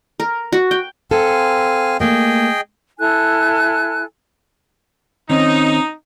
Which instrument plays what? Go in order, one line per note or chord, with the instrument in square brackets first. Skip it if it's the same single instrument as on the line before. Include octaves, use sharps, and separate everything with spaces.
[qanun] A#4
F#4
G5
[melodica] C4 F5 G#5 [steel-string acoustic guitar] A4
[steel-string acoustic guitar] A3 A#3 [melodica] G#4 D#5 G5
[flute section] E4 A4 G#5 F#6
[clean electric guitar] D#3 C4 C#4 [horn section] D#4